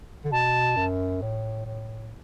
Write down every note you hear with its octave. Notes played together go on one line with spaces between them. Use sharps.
D3
B2 A5
F#2
A2
A2